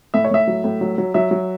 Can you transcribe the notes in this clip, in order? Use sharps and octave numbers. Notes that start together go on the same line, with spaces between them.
A2 E5
C#5
A2 E5
F#3
A2
F#3
F#3
F#3 E5
F#3